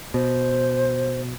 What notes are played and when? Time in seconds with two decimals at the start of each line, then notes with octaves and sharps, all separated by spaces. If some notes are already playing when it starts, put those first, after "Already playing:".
0.14 B2 C5